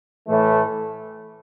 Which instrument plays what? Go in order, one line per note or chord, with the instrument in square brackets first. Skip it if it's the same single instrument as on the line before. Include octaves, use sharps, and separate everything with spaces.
[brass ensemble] A2 E3 A3